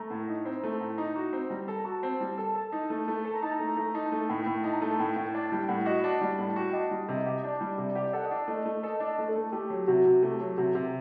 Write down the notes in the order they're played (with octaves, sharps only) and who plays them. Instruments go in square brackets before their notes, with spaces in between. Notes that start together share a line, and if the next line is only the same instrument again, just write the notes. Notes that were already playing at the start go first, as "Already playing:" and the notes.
Already playing: [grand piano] A3 [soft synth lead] A#5
[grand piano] A2
D#4
C4
A3
A2
D#4
F#4
C4
G3
A4
[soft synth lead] A#5
[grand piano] F#4 [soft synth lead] A5
[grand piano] C4 [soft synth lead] A5
[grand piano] G3 [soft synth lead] A5
[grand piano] A4 [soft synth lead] A5
[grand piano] A4
D#4
A3
A3
A4
[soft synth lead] A#5
[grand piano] D#4 [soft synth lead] A5
[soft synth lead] A#5
[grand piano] A3
A3
[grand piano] D#4 [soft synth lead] A5
[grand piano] A3
[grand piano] A2 [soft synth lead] G5
[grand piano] A2
[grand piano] D#4 [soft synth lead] A5
[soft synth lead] A#5
[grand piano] A3 [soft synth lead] A5
[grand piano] A2 [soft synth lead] G5
[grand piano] A2
[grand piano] D4 [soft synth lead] A5
[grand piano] G3 [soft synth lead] G5
[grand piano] A2 [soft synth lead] F#5
[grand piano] F#4 [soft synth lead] D#5
[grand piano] D4 [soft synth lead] D#5
[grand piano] G3 [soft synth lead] D5
[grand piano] A2 [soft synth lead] A5
[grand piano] F#4 [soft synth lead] G5
[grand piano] D4 [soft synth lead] D#5
[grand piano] G3
C3
G4
[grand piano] D4 [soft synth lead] D5
[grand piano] G3
C3
G4
[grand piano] A4 [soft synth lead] F#5
[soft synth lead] D#5
[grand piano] D4
[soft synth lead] D5
[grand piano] A3 [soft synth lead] D#5
[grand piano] A3
[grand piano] A4 [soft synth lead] D#5
[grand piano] D4
[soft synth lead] D#5
[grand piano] A3
[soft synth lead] A4
[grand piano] A3
[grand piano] A3 [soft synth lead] G4
[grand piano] F#3
[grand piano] C3 [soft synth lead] F#4
[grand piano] C3
[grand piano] A3 [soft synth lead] G4
[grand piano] F#3 [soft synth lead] G4
[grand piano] C3 [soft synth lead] F#4
[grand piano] C3 [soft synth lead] G4